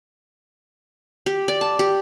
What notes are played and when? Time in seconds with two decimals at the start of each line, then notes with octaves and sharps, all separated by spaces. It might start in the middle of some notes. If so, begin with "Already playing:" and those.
1.26 G4
1.48 D5
1.61 A5
1.79 G4